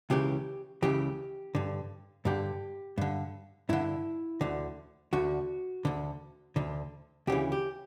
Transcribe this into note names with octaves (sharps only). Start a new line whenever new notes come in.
C#2 C#3 E3 G4
C#2 C#3 E3 G4
G2 D3
G2 D3 G4
G2 D3
G2 D3 E4
D2 D3
D2 D3 F#4
D2 D3
D2 D3
D2 C#3 E3 G4
G4